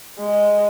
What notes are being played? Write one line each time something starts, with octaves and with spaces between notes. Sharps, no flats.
G#3